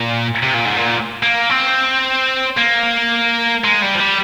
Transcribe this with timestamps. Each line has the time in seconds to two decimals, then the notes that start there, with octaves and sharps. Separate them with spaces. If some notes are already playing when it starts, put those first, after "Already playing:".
Already playing: A#2
0.43 C3
0.54 A#2
0.65 G#2
0.76 A#2
1.23 A#3
1.50 C4
2.57 A#3
3.64 G#3
3.82 G3
3.95 F3
4.00 G3